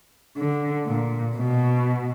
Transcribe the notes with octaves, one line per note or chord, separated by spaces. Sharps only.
D3
A#2
B2